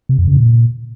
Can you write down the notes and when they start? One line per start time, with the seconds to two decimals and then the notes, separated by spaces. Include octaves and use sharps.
0.09 C3
0.18 F2
0.28 C#3
0.37 A#2